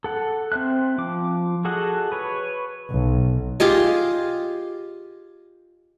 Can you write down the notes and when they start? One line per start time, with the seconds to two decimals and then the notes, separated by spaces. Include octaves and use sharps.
0.04 A4 F#5
0.52 C4 C5 E5 F#6
0.98 F3 D6
1.65 F#4 G#4 A4 D#5 F#5
2.12 B4 C#5
2.90 B1
3.60 F4 G4 G#4 D#5